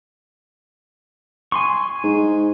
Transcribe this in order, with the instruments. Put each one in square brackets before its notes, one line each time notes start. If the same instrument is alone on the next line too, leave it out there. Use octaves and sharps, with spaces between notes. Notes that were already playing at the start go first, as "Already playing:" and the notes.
[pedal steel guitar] G#5 C6 C#6
[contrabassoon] G#2